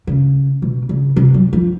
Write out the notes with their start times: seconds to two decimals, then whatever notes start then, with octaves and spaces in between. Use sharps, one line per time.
0.07 C#3
0.62 B2
0.89 C#3
1.16 C3
1.34 F#3
1.53 F3